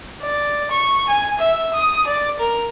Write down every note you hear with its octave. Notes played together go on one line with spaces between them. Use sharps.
D5
C#6
G#5
E5
D#6
D5
A#4